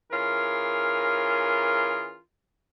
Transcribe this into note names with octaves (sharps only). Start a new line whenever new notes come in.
E3 C#4 F4 G#4 A#4